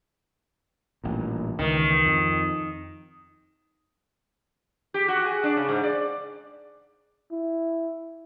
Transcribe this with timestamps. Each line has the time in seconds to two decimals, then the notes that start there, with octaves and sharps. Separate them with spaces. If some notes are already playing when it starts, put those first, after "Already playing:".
1.04 A1 G2 A#2
1.59 C#2 D#3 E3
2.06 F2
4.94 G4
5.08 F#4
5.26 G#4
5.43 D4
5.57 C#3
5.69 G#2
5.83 D5
7.32 E4